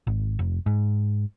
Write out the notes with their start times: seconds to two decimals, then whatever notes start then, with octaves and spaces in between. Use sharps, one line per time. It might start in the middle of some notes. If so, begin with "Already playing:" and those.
0.07 G#1
0.39 F1
0.66 G#2